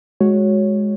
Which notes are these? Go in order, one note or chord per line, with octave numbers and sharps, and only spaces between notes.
G#3 F#4 C#5